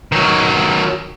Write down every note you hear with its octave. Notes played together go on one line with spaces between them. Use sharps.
D#3 F#3